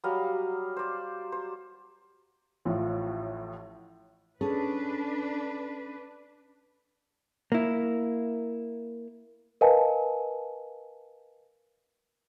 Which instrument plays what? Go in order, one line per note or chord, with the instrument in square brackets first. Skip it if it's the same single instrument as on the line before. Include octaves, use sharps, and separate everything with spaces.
[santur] F#3 G3 D#5 F5
C5 D5
C5
[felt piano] A1 A2 F3
[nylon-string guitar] C#4 G#4 A4 [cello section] D4 B4
[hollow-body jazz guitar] A#3 E4
[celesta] A#4 B4 D#5 F5 G#5 A5